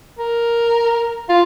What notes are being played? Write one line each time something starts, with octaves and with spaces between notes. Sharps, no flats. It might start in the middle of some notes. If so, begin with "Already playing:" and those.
A#4
F4